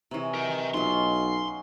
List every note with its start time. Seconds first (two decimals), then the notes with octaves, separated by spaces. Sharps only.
0.11 C3 E3 G#4 C#5 A#5
0.34 F#3 D#4 A#4 G5
0.74 B1 F#3 C#4 F4 D#5 C6